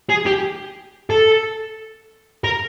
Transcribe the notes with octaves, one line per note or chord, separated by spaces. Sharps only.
G#4
G4
A4
A#4